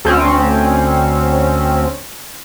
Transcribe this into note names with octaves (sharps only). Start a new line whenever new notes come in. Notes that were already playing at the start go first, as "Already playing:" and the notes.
D2 C4 C#4